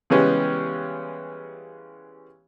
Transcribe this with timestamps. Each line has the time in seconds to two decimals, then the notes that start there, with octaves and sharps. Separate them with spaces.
0.10 C#3 E3 G3 G#3 B3 C#4